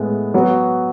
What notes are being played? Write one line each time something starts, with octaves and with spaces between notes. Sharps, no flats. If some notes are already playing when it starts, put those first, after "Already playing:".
Already playing: A2 G#3 B3
F#3 B3 F#4